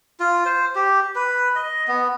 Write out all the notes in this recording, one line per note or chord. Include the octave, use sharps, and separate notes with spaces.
F4
C5
G4
B4
D#5
B3